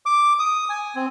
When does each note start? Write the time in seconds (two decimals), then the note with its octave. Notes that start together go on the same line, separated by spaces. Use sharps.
0.06 D6
0.39 D#6
0.69 G#5
0.95 C4